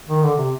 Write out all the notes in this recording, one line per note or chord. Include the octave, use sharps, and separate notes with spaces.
D#3
D3
C3